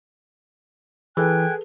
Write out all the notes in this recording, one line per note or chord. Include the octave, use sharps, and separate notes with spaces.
E3 G#4 A4 B4 G5 G#5 F#6